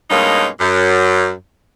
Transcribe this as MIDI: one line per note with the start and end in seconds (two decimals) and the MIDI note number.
0.10 0.46 43
0.10 0.46 47
0.10 0.46 56
0.10 0.46 58
0.10 0.46 61
0.10 0.46 63
0.61 1.31 42